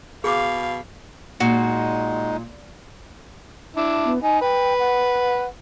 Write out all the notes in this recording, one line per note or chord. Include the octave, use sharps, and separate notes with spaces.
B2 G#4 F5 D6
A#2 G#3 D#4 F#4
D4 E4
B3
D#4 G#5
B4 G5
F#5